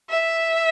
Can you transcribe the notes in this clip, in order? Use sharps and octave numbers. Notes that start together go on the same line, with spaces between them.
E5